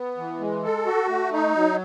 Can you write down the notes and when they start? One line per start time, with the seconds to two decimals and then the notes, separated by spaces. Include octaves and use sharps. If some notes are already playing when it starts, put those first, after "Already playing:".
Already playing: B3
0.18 E3
0.40 G#3
0.63 A4
0.86 F#4
1.09 A3
1.32 D#4
1.55 F#3